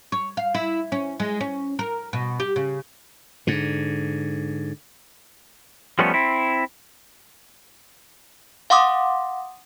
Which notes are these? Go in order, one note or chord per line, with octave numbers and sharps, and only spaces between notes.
C#5
F5
E4
C#4
G#3
C#4
A#4
B2
G4
C#3
G#2 D3
F3 G3 A3 B3 C#4
C4 E4
F5 F#5 C6 D6 D#6